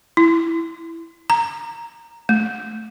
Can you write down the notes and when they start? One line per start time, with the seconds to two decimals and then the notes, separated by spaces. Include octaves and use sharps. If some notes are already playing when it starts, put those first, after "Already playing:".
0.17 E4
1.30 A#5
2.29 A3